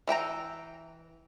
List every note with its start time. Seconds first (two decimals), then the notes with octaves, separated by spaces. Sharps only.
0.07 E3 E5 G5 A#5